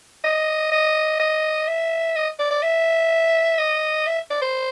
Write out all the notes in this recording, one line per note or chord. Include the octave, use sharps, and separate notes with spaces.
D#5
D#5
D#5
E5
D#5
D5
D5
E5
D#5
E5
D5
C5